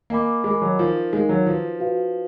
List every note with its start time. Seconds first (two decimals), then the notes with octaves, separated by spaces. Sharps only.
0.10 A#3 A#4 D#5 G#5 B5 D6
0.44 G#3 A#4 D#5 G#5 B5 D6
0.62 F#3
0.79 F3 D#4 A#4 F5
1.13 G#3 D#4 A#4 F5
1.29 F#3
1.47 F3 F#4 B4 F5
1.80 F#4 B4 F5